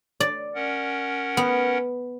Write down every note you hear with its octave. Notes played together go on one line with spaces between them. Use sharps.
D5
C#4 A#4 F#5
B3